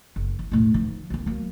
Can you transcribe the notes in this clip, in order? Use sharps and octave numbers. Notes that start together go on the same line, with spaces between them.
F#1
E3
E1 A2
D#3 F3
D2 A#3
F#3 A#3